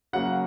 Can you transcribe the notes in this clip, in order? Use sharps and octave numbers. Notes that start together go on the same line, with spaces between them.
C#3 F#3 A#3 F#5